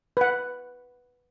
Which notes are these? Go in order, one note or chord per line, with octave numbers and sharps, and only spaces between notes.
B4 F#5